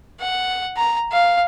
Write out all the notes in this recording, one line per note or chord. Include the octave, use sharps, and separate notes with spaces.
F#5
A#5
F5